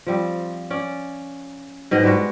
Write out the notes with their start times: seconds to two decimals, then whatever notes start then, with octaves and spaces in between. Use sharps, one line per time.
0.07 F3 G3 C4
0.70 C#4 D5
1.91 G#2 B2 F#3 D#5
2.03 G3 G#3 F#4